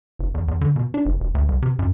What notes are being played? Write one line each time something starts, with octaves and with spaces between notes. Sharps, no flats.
F#1
E2
E2
D3
B2
D4
F#1
E1
D2
C2
C3
F#2